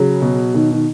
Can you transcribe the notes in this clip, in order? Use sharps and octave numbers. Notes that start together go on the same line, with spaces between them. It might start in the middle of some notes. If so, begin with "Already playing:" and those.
Already playing: C#3 F#3
B2
B2 D#3
D#3